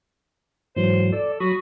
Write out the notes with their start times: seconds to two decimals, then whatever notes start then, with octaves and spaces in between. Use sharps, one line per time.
0.76 G#2 E3 F#3 C5
1.13 A4 D5
1.40 F#3 F#4 B5 D#6